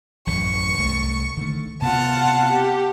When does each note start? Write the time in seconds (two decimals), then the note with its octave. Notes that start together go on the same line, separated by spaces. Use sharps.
0.27 A1 F#2 E3 C#6
0.77 C2 A3
1.37 D3 D#3 A3
1.82 C3 B3 F4 F#5 A5
2.52 G4